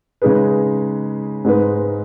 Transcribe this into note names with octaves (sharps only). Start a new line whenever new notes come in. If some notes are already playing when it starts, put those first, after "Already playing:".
C#3 G#3 D#4 G#4 B4
G#2 G#3 D#4 B4